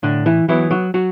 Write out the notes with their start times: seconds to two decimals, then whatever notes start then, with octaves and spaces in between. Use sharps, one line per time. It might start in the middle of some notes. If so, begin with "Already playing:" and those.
0.03 A2 D3 D4
0.26 E3 E4
0.48 E3 F#3 B3 E4
0.71 F#3 F#4
0.94 F#3 F#4